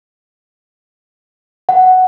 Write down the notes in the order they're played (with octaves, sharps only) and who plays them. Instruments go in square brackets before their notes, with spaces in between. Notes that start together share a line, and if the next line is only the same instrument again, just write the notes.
[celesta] F#5